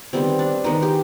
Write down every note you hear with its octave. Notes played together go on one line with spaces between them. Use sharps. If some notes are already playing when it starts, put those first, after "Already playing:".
D#3 G3 B3 C4
D4
D#3 G#3 B3 D#4
G4